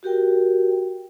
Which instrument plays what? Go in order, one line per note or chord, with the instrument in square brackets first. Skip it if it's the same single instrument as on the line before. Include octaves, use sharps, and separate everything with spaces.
[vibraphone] F#4 G4 A#4 G5